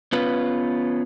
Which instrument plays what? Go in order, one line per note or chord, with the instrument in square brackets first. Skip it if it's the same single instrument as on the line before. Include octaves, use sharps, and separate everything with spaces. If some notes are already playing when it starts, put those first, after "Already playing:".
[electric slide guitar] B3 C#4 F4 B4